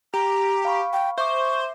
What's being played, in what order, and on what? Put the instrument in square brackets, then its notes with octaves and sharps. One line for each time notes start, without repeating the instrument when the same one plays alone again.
[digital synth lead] G4 [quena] A#5
[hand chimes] F5 B5 C#6
[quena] G5
[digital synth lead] C5 [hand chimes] E5 D6 [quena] C#6